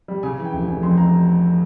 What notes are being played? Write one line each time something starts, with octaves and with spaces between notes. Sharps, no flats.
G3
C#3 G#5
E3
G5
F1
F1 G#5
F2 C6
F1 A#5